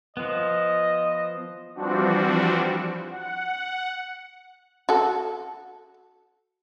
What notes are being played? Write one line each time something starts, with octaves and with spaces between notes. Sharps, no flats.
F3 B3 D#5
E3 F3 G3 C4 D4 F#4
F#5
F#4 A4